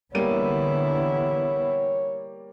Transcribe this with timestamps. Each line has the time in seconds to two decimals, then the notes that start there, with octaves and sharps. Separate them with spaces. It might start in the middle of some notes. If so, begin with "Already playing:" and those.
0.15 D3 E3 G3 A#3 B3 E4 C#5 D#7